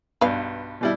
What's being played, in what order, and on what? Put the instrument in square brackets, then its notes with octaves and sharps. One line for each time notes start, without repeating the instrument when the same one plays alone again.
[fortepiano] B1 G2 [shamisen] B4 F5
[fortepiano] B2 G3 E4